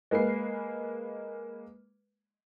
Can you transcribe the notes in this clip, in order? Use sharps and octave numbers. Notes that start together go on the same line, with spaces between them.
G#3 A#3 B4 C7